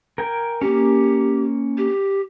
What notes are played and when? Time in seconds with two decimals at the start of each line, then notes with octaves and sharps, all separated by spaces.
0.18 A#4 G5 G#5
0.61 A#3 C#4 G4
1.78 G4